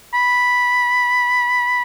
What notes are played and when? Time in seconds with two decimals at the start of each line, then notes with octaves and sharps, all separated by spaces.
0.14 B5